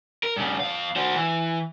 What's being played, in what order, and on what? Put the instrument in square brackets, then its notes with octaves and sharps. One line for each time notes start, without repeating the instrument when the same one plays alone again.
[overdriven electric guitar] A#4
G2 C#3
F2 F5
F#4 C5
E3